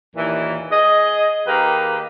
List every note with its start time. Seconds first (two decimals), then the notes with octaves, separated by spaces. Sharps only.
0.16 D#2 A#2 E3
0.71 G#4 D#5
1.47 D#3 A#3 G4 G#4 B4